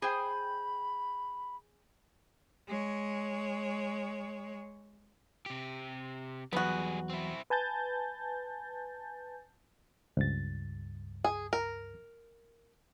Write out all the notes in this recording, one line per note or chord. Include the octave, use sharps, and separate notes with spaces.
G#4 C5 G5 B5
G#3 C#5
C3 G4
E2 F#3 G3 B3 F#4 G#4
C4 E4
B4 G#5 A5 G6 A6
C#2 G2 A6
G#4
A#4